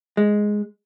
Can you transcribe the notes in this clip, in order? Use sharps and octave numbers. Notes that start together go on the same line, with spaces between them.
G#3